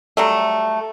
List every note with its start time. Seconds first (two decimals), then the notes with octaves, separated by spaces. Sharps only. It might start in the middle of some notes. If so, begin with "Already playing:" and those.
0.17 F#3 G3 A3